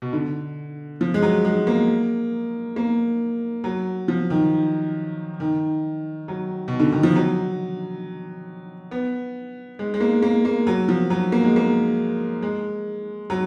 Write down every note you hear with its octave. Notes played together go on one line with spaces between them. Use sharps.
B2
D3
F3
G#3
F#3
G#3
A#3
A#3
F#3
F3
D#3
D#3
F#3
B2
D3
D#3
F3
F#3
B3
G#3
G#3
A#3
A#3
A#3
F#3
F3
F#3
A#3
G#3
A#3
G#3
F#3